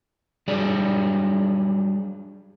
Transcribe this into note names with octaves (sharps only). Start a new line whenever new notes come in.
F#3 G3 D4 G#4 D5